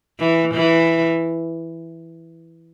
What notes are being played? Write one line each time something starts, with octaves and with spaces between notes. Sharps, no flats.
E3
E3